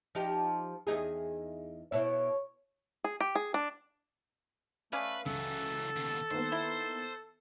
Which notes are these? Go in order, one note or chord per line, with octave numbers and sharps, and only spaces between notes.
F3 D#4 G4
E2 D#4 G#4
B2 E4 C#5
G#4
G4
G#4
D4
A3 C#4 B4 D5 F5
C#2 E3 F#3 A4
D#2 B2
D#3 A#3 B3 C5
E4